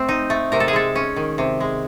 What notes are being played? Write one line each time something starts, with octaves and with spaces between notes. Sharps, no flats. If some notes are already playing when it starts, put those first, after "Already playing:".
Already playing: A3 C4
D#4
A3
C3 A#4
A4
G#4
G#3 A4
C#4
D#3
C3
G#3